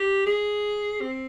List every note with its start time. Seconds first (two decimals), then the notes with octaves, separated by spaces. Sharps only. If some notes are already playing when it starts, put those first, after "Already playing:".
Already playing: G4
0.26 G#4
1.01 C4